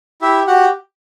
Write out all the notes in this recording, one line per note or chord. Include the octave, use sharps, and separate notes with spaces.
E4 G4 E5
F#4 G4 F#5